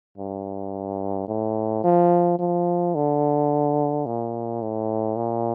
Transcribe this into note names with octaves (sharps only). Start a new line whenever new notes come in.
G2
A2
F3
F3
D3
A#2
A2
A#2